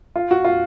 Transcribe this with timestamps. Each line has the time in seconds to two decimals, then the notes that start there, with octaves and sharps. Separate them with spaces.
0.16 F4
0.31 F#4
0.44 F4